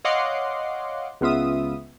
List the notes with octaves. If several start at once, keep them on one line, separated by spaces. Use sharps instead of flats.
C#5 D#5 F5 F#5 C6 D6
C#2 B3 F4 E5 D#6